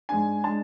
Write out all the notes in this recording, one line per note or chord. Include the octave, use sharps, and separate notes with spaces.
G#2 G#3 D4 G#5
G#3 D4 A5